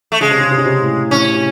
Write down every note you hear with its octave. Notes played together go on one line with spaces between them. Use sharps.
A3
C#3 G#3
C3
C#3
C3
C#3
C3
A2
A2 C#4
C3